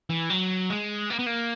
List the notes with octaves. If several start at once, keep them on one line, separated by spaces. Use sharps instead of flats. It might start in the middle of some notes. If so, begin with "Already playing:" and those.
E3
F#3
G#3
A#3
B3
A#3